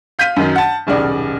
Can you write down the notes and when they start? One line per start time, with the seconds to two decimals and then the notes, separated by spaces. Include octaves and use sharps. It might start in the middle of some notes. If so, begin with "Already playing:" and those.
0.19 F5 G6 B6 D#7
0.36 F#2 D#3 F#3
0.55 F#5 A5
0.87 D#1 B1 C#3 D5